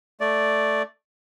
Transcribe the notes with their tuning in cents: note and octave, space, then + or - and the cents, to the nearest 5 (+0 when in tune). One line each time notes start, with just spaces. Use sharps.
A3 +0 D5 +0